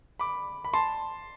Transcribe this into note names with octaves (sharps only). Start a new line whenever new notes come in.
B5 D6
B5
A5 C6